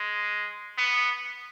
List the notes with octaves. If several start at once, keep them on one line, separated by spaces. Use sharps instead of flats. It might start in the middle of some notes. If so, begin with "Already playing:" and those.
Already playing: G#3
B3